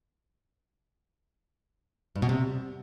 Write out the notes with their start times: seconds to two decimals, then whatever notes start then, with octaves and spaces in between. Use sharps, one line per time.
2.16 G2
2.22 B2
2.29 C3